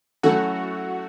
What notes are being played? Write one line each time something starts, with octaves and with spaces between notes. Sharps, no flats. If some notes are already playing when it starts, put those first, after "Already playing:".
F#3 A3 C#4 E4 F#4 A4